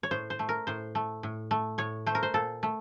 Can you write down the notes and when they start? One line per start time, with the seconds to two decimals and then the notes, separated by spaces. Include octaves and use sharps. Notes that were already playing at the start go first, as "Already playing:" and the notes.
0.03 C#5
0.11 A2 C5
0.30 C5
0.39 A3
0.49 A#4
0.67 A2 C5
0.95 A3
1.23 A2
1.51 A3
1.78 A2 C#5
2.06 A3 C5
2.15 A#4
2.23 C5
2.34 A#2 A4
2.63 A3